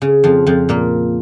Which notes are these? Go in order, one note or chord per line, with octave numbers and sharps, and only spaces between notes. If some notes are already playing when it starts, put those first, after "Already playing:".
C#3
F2 F3
F2 F3
A#2 A#3